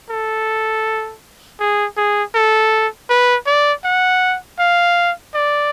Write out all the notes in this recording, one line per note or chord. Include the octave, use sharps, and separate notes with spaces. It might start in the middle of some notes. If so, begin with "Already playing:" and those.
A4
G#4
G#4
A4
B4
D5
F#5
F5
D5